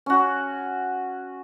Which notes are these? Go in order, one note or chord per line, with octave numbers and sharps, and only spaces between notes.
C#4 F#4